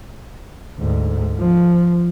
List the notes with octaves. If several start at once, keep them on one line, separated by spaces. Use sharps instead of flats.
D2 G#2
F3